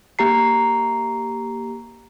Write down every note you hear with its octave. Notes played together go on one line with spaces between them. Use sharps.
A#3 G4 A#5 C7